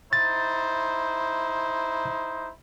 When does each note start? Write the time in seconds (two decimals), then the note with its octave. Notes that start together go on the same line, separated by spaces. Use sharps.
0.13 D#4 E4 C5 A6